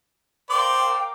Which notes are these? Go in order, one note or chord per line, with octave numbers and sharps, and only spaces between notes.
A#4 C5 D5 F5 G5 D6